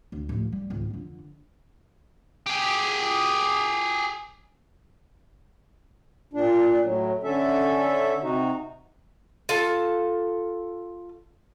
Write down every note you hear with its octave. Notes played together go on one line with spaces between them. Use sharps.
D2
A1 F3
G3
G#1 C#2
F2 D3
G4 G#4
A#2 D4
A2 F#3
D3 C#4 A4 E5
C3 D#4 F#4
F4 A4 A5